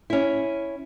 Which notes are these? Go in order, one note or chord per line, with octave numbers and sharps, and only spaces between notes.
C#4 E4